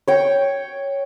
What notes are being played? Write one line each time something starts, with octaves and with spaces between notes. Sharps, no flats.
C#5 G5